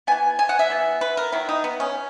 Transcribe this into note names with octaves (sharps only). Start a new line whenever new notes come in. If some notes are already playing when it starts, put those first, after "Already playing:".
E3 B3 G#5
G#5
F#5
E5
E3 B3
B4
A#4
D#3 F#3 B3 E4
D#4
B3
C#4